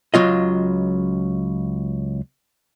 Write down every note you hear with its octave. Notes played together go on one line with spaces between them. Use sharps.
C#2 F#3 F4 D#5